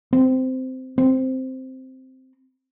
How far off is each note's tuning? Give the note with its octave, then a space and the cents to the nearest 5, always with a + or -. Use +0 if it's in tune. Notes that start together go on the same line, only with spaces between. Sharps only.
C4 -15
C4 -5